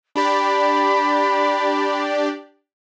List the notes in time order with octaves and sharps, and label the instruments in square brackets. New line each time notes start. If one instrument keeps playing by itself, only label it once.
[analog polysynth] D4 G4 D5 [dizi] B5